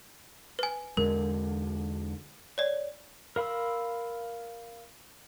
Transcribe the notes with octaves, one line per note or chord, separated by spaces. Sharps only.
B4 G#5
E2 D3 G#3 A#4
C#5 D5
A#4 F5 B5 C6 E6